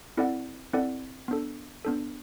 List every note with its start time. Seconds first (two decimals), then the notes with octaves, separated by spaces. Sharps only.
0.17 C4 E4 A4 D5 F#5
0.73 C4 E4 A4 D5 F#5
1.28 B3 D4 A4
1.85 B3 D4 A4